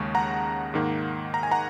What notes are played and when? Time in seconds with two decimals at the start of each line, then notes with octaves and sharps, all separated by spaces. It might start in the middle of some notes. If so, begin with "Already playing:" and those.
Already playing: D#2 C#3 G#3 C#6
0.15 F#5 A#5
0.74 G#2 D#3 A#3
1.34 A#5
1.43 G#5
1.51 F#5 A#5